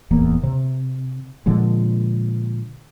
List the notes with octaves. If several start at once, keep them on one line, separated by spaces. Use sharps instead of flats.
D1 E2 A#3
C3
A#2 D3 F3 G#3